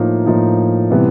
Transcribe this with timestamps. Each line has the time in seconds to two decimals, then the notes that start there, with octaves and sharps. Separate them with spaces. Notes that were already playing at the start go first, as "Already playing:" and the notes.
Already playing: A2 F3 A#3 D#4
0.26 A2 F3 A#3 D#4
0.91 C3 E3 G3 B3